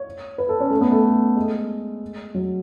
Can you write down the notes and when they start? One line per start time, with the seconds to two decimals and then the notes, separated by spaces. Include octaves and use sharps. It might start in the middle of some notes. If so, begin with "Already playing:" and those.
Already playing: C#5
0.38 B4
0.49 A4
0.60 C#4
0.70 A3
0.81 B3
0.92 A3
1.36 G#3
2.34 F#3